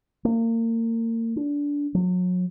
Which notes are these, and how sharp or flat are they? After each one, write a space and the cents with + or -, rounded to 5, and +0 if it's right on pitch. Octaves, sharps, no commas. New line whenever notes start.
A#3 -35
D4 -20
F#3 -35